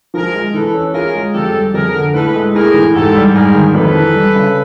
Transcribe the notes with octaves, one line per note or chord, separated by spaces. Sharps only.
F3 G#4 A#4
G#3
E3 A4 B4
C#4
F4 G#4 A#4
G#3
F2 G4 A4
G3
F2 G#4 A#4
D3
A2 A4 B4
G#3
A2 G#4 A#4
E3
G#2 G4 A4
G3
G#2 G#4 A#4
D#3
F2 A4 B4
E3
G3
C#3